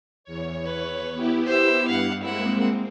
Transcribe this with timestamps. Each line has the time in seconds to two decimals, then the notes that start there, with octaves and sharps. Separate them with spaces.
0.24 E2 C#5
0.65 B4
1.14 B3 E4 G4
1.46 C5 E6
1.88 G2 F5 F#5
2.23 G#3 A#3 C4 E4 F#5